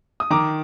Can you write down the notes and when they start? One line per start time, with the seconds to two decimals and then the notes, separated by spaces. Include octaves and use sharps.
0.20 D#6
0.30 D#3 A#5 D6